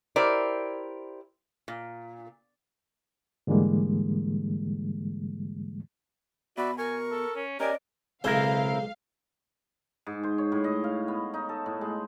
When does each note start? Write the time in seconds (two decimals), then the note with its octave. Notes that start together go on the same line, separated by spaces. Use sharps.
0.16 E4 G4 A#4 C5 D5
1.68 A#2
3.47 G#2 D3 E3 G3 G#3 A#3
6.58 B2 F#4 D5 E5 B5
6.78 A#4 G#5 C#6
7.11 A4
7.35 C#4
7.60 C#4 G4 A#4 D5 D#5 G#5
8.24 B1 C#3 G#3 C4 E4 A#4 C5 F5
10.07 G#2
10.23 C5
10.38 C#5
10.52 A2
10.64 D#5
10.84 F5
11.08 B3
11.34 D#4
11.49 A4
11.66 A2
11.81 G#3